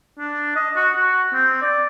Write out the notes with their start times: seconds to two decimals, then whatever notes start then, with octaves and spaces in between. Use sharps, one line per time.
0.19 D4
0.56 D#5
0.76 F#4
0.96 F#4
1.34 C4
1.62 D5